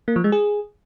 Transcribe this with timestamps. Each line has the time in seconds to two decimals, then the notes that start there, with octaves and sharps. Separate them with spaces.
0.08 A#3
0.16 F3
0.24 G#3
0.32 G#4